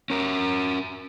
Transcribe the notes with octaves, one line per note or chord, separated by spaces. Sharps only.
C#4 A#4